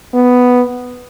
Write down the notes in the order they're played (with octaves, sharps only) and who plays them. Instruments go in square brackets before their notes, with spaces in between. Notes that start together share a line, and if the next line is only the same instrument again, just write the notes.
[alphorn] B3